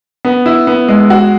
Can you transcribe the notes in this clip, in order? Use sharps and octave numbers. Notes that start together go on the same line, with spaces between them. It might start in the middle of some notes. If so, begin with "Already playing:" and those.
B3
E4
B3
G#3
F#4